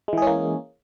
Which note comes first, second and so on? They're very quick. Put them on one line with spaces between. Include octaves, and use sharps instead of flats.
G#3 E3 G#4 C#4 A#3